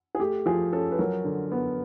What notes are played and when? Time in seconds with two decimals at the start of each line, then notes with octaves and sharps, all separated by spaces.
0.15 G#4
0.20 A3 G4
0.46 F3 G#4
0.73 C#4 A4
0.92 B4
0.99 F#3 A#4
1.24 D3
1.52 B3